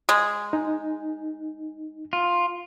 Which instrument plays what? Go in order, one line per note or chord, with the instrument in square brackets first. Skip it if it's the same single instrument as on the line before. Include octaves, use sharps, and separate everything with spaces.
[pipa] G#3
[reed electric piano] D#4
[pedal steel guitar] F4